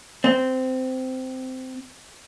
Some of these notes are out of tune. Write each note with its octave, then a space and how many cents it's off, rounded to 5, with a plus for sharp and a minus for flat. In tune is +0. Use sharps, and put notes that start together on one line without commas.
C4 -15